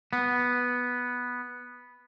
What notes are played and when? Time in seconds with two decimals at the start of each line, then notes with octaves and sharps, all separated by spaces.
0.13 B3